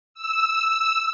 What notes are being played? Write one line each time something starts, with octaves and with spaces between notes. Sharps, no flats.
E6